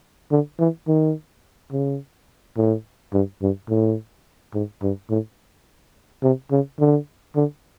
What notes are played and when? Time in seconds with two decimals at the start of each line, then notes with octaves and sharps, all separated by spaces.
0.31 D3
0.60 E3
0.88 D#3
1.72 C#3
2.57 A2
3.13 G2
3.42 G2
3.69 A2
4.54 G#2
4.82 G2
5.10 A2
6.23 C3
6.51 C#3
6.80 D3
7.36 D3